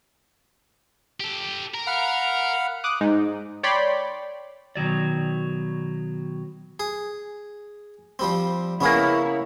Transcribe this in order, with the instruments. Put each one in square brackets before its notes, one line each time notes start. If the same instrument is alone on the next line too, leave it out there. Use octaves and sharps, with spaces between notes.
[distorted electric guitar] G4 A4
A#4
[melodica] F5 F#5 B5
[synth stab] D6 D#6 F#6
G#2 D#4
C#5 D5 G5 B5 C6
[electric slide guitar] B2 D#3 F#3 D5
[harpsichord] G#4
F3 G3 C4
[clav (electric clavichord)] C#3 A#3 [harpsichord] B3 C#4 G#4 [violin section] E4 C#5